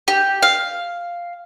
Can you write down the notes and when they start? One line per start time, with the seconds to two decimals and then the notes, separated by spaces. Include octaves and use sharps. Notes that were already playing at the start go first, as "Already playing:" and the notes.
0.08 G4
0.42 F5